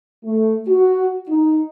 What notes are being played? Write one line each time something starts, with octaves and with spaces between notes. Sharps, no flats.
A3
F#4
D#4